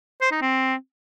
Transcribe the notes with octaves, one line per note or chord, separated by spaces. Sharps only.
C5
D#4
C4